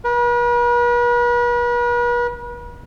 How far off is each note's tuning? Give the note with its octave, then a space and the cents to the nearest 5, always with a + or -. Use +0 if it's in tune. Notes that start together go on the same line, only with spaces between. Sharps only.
B4 -45